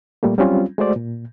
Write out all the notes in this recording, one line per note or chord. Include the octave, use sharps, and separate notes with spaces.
A#2 G3 A3 A#3
F#3 G3 C4 C#4 F4
G#3 A3 F#4 C5 D5
A#2